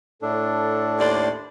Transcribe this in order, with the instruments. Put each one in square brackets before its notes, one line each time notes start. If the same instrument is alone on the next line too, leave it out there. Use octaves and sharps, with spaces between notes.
[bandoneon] A2 D4 [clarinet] A4
[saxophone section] D#2 C5 D5